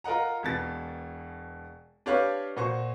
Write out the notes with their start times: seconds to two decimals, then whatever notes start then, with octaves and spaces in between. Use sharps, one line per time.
0.04 F4 A#4 D#5 F#5 A#5
0.43 E1 B2 A6
2.06 D4 G4 B4 C#5 F5
2.57 A#2 F#4 C5 C#6